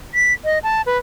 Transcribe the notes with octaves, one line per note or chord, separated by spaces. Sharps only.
B6
D#5
A5
B4